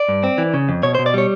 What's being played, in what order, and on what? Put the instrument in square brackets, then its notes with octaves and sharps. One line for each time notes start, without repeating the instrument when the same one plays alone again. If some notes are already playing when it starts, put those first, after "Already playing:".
Already playing: [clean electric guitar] D5
G2
C4
E3
C#3
F2
B2 C#5
C5
B2
D5
G3 C#5